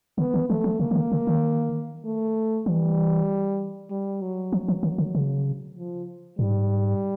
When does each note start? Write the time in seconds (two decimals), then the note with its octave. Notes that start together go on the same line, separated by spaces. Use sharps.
0.18 D3 B3
0.34 D#3
0.49 E3 A3
0.64 F3
0.80 C#3 A#3
0.91 D#3
0.96 D3
1.12 D3
1.27 D#3
2.05 A3
2.66 E3 G3
3.90 G3
4.21 F#3
4.52 F3
4.68 E3
4.83 D#3
4.98 D3
5.15 C#3
5.77 F3
6.39 G#2 G3